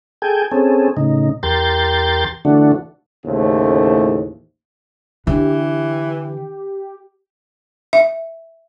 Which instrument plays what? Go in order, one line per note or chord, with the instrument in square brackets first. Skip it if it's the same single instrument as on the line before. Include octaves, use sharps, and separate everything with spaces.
[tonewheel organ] G#4 A4 G5 G#5
C4 C#4 G#4 A4
A2 C#3 D#4
E2 G4 A#4 C6 G6 A6
D3 E3 A3 D4 F#4
[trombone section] A1 D#2 A2 C#3 A3 C5
[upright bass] D3 [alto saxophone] E3 [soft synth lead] G4
[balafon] E5